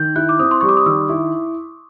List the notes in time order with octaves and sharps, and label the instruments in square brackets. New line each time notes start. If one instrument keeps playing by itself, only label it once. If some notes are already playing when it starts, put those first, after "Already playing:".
Already playing: [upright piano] D#3 [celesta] G6
[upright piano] E4 [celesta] F#6
[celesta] D6
[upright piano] C4 [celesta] D#6
[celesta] C6
[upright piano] G3 [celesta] C#6
[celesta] D6
D#6
[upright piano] D#3 [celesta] E6
[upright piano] E4